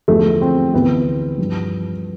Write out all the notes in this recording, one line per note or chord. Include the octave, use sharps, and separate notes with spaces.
E2 D3 F3 A3
C4
D2 C3 E3 B3
G2 F3